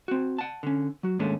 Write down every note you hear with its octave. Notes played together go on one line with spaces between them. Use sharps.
C4 F#4
F#5 A5
D3 C#4
F#3 F#4
D#2 G#2 G#3 A3 C#4 D4